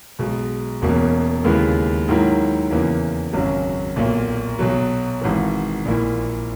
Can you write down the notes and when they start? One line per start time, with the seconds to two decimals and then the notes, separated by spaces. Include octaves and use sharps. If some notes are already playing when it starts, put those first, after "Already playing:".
0.19 B1 B2 G#3
0.82 E1 E2 B2 A#3 C#4
1.44 D#2 C#3 G#3 B3 E4
2.08 G#2 D#3 F#3 A#3 E4
2.71 E2 C#3 E3 A#3
3.33 G#1 F#2 C#3 F#3
3.96 B1 A#2 A#3
4.59 B1 B2 F#3
5.21 G#1 G#2 E3
5.85 A#1 A#2 A#3 E4